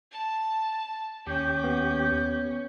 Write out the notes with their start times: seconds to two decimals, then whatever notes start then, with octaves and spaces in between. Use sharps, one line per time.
0.12 A5
1.27 D#2 C#4 G4 G6
1.64 B3